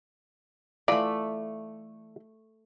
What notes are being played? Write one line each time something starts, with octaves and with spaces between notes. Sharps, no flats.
E3 A3 F4 D5 B5